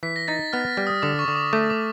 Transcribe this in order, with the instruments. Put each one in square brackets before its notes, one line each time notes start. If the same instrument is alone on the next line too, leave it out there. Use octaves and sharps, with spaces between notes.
[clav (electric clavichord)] E3 [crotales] B6
[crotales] A#6
[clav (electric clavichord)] D#4 [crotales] A6
[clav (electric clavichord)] B3 [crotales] F6
[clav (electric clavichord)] G3
[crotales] D#6
[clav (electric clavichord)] D3 [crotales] D6
[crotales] C#6
[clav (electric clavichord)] D3
[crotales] D6
[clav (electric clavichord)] A3 [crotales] D6
[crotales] D6